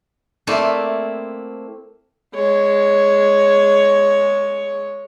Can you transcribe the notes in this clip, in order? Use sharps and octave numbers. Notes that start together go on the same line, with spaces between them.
A3 A#3 C4 E4 D5
G#3 C#5